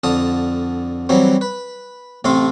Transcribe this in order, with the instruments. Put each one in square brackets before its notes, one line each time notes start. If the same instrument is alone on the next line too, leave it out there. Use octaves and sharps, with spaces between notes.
[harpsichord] F2 D3 A5 D#6
E3 F#3 G3 C4
B4
A1 C3 A3 A4 C6